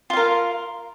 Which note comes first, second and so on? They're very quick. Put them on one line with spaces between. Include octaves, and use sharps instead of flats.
F4 F5 A#4